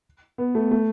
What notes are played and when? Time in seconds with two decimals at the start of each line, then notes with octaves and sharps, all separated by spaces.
0.38 B3
0.55 A3
0.71 A3